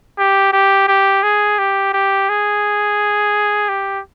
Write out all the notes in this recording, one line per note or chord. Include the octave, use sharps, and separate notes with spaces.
G4
G4
G4
G#4
G4
G4
G#4
G4